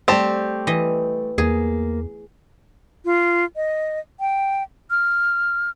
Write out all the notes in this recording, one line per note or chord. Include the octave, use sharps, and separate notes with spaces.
G3 A3 C4 G4 D5 A5
E3 D#5
E2 A#3 G#4
F4
D#5
G5
F6